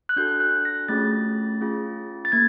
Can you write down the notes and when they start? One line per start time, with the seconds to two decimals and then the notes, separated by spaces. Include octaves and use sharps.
0.09 F#6
0.16 D4 F#4 A4 G6
0.40 F#6
0.65 A#6
0.88 A3 C#4 F4 G#4 A6
1.61 C#4 F4 G#4
2.25 A6
2.32 A#3 G#6